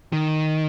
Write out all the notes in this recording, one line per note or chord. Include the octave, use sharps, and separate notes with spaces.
D#3